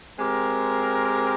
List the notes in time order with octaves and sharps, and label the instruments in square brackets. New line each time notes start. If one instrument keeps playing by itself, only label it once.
[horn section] G#3 C4 G4 A#4